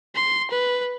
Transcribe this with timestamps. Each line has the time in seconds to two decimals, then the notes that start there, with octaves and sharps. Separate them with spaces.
0.15 C6
0.51 B4